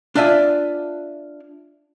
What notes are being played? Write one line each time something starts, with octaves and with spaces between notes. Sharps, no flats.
D4 F4 D5 E5 G#5